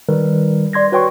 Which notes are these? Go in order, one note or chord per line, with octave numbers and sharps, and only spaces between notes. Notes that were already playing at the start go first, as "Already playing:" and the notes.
D#3 G3 A#4 B4
D5 C6 G#6 A#6
F#4 B4 C#5 G5 C6 C#6